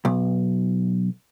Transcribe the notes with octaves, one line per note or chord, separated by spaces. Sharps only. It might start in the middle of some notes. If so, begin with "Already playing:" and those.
B1